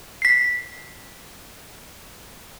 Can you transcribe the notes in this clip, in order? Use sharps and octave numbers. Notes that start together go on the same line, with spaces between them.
B6 C7